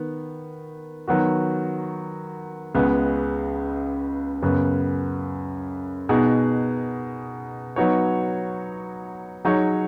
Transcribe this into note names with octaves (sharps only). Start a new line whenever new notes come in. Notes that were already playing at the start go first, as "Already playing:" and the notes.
Already playing: D#3 B3
D#3 F#3 B3 F#4
C#2 C#3 G#3 B3
F#2 C#3 B3
B2 B3 D#4 G#4
F#3 B3 D#4 F#4 C#5
F#3 D#4 G#4 C#5